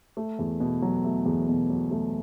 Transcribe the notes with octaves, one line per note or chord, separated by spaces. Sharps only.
A3
E2
B2
F#3
A3
E2
B2
F#3
A3